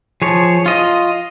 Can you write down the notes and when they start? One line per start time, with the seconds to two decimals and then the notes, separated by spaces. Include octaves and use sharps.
0.22 F3 G#4 C#5
0.66 F4 D#5